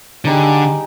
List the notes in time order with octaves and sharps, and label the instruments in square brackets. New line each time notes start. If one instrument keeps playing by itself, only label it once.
[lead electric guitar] D3 [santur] G3 D#4 G#4